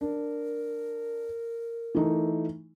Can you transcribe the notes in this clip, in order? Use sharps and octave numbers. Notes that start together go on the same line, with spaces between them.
D4 A#4
E3 A3 D#4